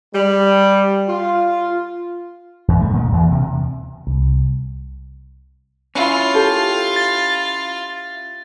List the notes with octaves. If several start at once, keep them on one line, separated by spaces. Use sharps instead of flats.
G3
F4
E2
G2 A3
A#2 D#3
E2 E3
D2 C3
C2
C#4 E4 F4
G4 A4
A6